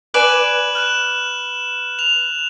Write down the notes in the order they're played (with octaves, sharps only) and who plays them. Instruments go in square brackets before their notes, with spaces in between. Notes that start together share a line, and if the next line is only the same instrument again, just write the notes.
[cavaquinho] B4 D5 G#5 [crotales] F#6 E7 F#7
[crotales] F6 F#6 E7
F7